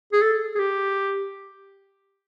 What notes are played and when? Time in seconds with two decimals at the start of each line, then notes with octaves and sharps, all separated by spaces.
0.12 G#4
0.22 A4
0.55 G#4
0.59 G4